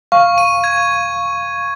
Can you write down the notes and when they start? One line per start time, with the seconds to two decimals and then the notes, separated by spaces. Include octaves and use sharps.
0.12 F5 C#6
0.38 D#7
0.64 G#6